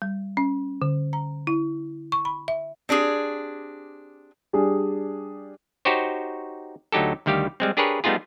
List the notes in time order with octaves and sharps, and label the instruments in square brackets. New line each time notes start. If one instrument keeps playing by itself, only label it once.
[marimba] G3
C#4
D3
A#5
E4
C#6
B5
E5
[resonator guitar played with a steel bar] C4 D4 G4 G#4
[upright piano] G3 D4 G#4
[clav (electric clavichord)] D#4 F#4 G4 C5 C#5
D2 F#3 D#4 G4 A4
D2 D#3 G3 G4 F5
G3 G#3 C4
D4 G4 G#4 A#4 B4 C#5
G3 A3 B3 D#4 F4 G#4